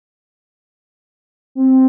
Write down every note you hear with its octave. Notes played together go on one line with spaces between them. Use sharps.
C4